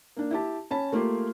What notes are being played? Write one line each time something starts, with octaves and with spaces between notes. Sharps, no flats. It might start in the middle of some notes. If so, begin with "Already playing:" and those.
A#3 D4
E4 G4 A5
C#4 C#5 A5 B5
A3 A#3 F4 G4 C6